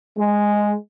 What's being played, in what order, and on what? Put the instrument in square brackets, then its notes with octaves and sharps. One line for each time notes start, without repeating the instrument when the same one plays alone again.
[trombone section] G#3